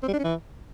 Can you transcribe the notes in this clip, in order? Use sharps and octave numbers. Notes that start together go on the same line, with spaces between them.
C4
G3
D4
C#4
E3